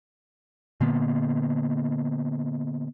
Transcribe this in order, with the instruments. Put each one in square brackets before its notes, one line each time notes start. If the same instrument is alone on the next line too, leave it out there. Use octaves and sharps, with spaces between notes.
[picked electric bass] A#2 D3 A#3 B3